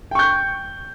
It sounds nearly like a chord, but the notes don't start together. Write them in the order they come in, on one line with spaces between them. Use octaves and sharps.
G5 C#6 G6